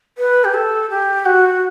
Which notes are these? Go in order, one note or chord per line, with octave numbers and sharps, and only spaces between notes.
B4
G4
A4
G4
F#4